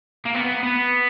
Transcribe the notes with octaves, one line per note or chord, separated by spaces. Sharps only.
A#3
B3
B3